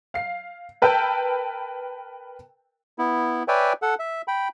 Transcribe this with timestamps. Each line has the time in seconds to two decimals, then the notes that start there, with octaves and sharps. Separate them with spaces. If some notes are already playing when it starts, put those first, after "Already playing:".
0.14 F5 C7
0.82 A#4 B4 G5 A5 E6 G6
2.98 B3 E4
3.48 B4 C#5 D5 E5 G5 G#5
3.82 A4 F#5
3.99 E5
4.28 G5 B5